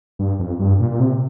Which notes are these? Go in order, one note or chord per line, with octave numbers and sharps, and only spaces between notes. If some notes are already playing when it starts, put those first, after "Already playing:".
G2
F2
G2
A#2
A#2
C3